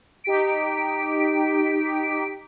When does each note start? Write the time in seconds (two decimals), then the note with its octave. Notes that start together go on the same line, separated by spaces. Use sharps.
0.24 D#4 G4 B6 D7